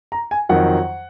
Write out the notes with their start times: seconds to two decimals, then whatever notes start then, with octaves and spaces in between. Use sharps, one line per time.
0.12 A#5
0.31 G#5
0.49 F2 D#3 F#3 F#5